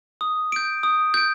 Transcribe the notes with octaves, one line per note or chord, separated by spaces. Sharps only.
D#6
G6 D7
D#6
G6 D7